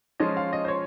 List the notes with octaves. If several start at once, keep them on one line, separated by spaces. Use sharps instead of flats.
F3 G#3 C#4 F4 D#5
F5
D#5
C5
C#5